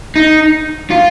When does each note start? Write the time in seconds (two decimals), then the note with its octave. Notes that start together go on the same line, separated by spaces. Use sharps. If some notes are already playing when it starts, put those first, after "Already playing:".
0.16 D#4
0.90 F4